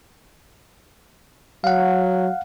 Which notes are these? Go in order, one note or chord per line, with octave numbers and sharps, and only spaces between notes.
F#3 F5 F#5